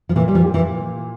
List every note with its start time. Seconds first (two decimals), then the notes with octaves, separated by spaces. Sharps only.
0.09 F3
0.16 A#2 E3
0.28 G3
0.35 F3
0.44 G4
0.54 E3